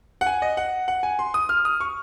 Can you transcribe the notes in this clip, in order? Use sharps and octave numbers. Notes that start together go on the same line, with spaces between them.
F#5
G#5
D#5
F#5
F#5
G#5
C6
D#6
F6
D#6
C#6